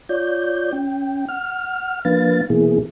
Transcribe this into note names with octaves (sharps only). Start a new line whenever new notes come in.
F4 C#5 D5 G6
C#4 G5
F#5 F6
F3 A#3 D4 B4 F5 A6
B2 E3 A#3 B3 E4 G#4